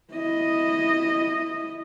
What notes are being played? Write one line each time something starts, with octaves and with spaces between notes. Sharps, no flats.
E4 D#5